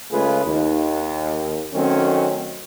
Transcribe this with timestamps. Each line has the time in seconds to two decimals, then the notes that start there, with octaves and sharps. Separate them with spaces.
0.11 C#3 G#3 A3 F4 G#4 B4
0.45 D#2
1.73 D#3 F#3 A3 C4 C#4